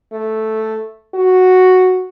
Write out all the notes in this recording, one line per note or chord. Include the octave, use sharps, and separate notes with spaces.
A3
F#4